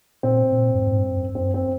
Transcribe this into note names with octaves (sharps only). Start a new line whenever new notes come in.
A#2 C4
A#2
G2
G#2
G#2
G2
F#2
F#2 C4
C4